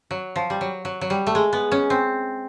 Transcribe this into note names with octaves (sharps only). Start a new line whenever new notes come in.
F#3
F3
G3
F#3
F#3
F#3
G3
A3
G#3
B3
C#4
C4